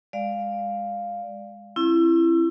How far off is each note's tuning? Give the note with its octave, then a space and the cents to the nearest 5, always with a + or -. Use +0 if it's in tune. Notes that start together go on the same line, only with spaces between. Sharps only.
G#3 -20 D5 +0 F5 +0
C4 +45 E4 +25